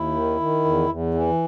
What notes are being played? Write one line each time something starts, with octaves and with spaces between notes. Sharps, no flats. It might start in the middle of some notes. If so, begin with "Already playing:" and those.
Already playing: D#2 E4
D#3
D#3
E2
E2
E3